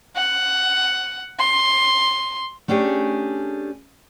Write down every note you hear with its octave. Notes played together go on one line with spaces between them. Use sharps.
F#5
C6
A3 C#4 D4 G4 G#4